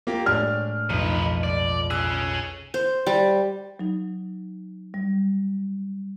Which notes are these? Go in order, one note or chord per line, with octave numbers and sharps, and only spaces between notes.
A#3 F4 G4
A2 G#3 D4 F6
B1 F2 D#3 B4
D5
C#4 G#4 E6 F#6
C5
G3
F#3 D#4
G3